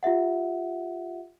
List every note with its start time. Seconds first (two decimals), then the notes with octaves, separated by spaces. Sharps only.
0.03 F4 G4 E5 F#5